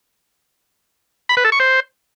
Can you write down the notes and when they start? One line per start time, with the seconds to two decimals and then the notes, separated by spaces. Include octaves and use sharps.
1.29 B5
1.37 B4
1.45 A4
1.52 C#6
1.60 C5